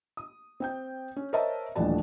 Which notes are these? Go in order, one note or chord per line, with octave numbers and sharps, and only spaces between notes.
D#6
C4 G5 G6
C#4
A#4 C5 C#5 D#5 E5 A5
D#1 A1 E3 F3 D4 A5